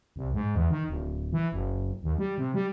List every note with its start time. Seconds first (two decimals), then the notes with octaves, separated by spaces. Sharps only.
0.16 C2
0.34 G#2
0.55 E2
0.70 D#3
0.88 D1
1.33 E3
1.52 F#1
2.03 D#2
2.18 G3
2.38 C3
2.54 G3